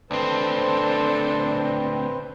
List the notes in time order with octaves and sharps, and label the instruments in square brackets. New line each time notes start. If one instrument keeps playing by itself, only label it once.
[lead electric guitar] D2 C4 [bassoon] D4 [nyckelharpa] A4 C6 [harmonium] B4 C5